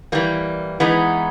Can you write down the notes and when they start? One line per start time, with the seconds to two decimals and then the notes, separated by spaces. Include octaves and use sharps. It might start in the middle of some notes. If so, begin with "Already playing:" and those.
0.12 E3 G3 A#3
0.80 E3 G#3 B3 D#4